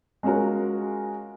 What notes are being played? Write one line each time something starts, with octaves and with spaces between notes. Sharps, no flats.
G#3 C#4 F4 F#4 A#4